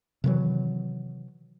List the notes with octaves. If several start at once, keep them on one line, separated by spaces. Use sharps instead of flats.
C3 D#3 E3 F#3